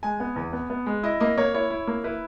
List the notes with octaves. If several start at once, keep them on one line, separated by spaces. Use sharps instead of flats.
G#3 G#5
B3
E2
B3
B3
G#3
E4 D#5
A#3 D#5
A#3 C#5
E4 C#5
E4
A#3
E4 B4